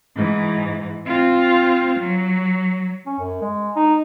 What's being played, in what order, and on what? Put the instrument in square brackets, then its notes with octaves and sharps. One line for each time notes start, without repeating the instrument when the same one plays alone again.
[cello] G#2 E3
C4 F4
F#3
[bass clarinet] C#4
F#2
G#3
D#4